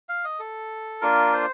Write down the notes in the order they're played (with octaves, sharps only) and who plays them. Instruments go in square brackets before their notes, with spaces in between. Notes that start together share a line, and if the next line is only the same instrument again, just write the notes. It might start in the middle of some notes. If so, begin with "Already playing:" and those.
[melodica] F5
D#5
A4
A#3 D4 F4 A#4
C5